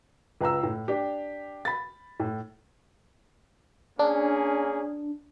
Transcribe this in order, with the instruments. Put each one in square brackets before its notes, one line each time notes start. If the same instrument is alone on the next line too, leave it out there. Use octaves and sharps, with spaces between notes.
[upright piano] C#2 B4 A#5 E6
A2
D4 G4
B5 A6
A2
[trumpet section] A#3 C#4 G#4 [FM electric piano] D4